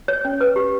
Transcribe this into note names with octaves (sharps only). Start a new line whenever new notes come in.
C#5
C#4
B4
G4